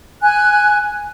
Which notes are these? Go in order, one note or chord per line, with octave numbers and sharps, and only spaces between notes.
G#5 F#6